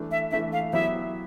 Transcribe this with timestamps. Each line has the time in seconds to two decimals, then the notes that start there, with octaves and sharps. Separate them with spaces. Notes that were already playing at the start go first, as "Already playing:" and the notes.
Already playing: E3 A3 D4
0.11 E5
0.31 E3 A3 D4 E5
0.53 F5
0.73 F#3 B3 E4 G4 E5